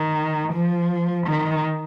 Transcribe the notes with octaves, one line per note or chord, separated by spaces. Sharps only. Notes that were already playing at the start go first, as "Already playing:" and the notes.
Already playing: D#3
F3
D#3